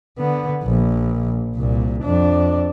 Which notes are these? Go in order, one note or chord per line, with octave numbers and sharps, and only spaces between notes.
D3 B3
A#1
C2 A#2
F2 D4